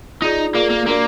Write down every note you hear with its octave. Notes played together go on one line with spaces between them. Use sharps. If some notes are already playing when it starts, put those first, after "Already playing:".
D#4 F4 G#4 D5
A#3 F4 G#4 D5
A#3
A#3 D4 F#4 A#4 D5